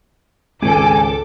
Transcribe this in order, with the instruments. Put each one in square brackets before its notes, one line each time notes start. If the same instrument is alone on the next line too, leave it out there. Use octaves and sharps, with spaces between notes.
[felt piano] G#1 [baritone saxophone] C#2 [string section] A4 D6 [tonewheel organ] G#5